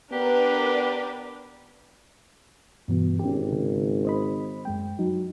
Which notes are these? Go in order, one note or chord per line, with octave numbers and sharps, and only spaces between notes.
B3 D4 G4 A#4 B4
G2 B2 E3 B3
G#1 C#4 G4
C#3
C5 D#5 B5
F#2 G#3 G5
F#3 D#4